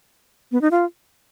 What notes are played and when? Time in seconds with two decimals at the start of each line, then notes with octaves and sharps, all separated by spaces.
0.52 B3
0.61 D#4
0.71 F4